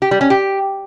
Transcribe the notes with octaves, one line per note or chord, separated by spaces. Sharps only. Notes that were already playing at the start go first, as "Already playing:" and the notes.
G4
G3
C#4
G4